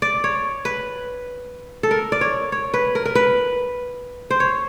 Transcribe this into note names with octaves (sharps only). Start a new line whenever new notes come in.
D5
C#5
B4
A4
A#4
D5
C#5
C#5
B4
A#4
A#4
B4
C5
C#5